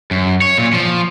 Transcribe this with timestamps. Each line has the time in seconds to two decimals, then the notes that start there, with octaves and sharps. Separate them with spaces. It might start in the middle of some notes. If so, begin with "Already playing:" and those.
0.11 F#2
0.42 C#5
0.58 A#2
0.73 F3